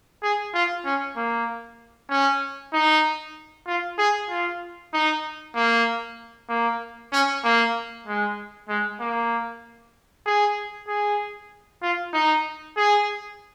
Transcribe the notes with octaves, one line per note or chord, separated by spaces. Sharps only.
G#4
F4
C#4
A#3
C#4
D#4
F4
G#4
F4
D#4
A#3
A#3
C#4
A#3
G#3
G#3
A#3
G#4
G#4
F4
D#4
G#4